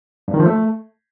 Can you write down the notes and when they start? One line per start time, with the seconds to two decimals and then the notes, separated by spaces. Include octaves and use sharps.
0.28 G2
0.34 D#3
0.40 F3
0.46 A3